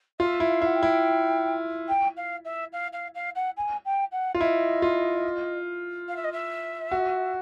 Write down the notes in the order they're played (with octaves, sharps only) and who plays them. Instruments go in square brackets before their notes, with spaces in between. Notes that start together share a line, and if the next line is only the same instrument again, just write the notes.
[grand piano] F4 [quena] E5
[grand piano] E4
[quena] F5
[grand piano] E4 [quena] F#5
[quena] G5
[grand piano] E4
[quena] G5
F5
E5
F5
F5
F5
F#5
G#5
G5
F#5
[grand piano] F4
[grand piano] E4 [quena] D#5
[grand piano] F4
[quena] F5
E5
D#5
E5
[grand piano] F#4